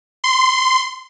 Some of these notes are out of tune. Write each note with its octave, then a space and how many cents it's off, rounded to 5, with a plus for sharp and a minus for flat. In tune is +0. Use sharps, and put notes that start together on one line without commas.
C6 -15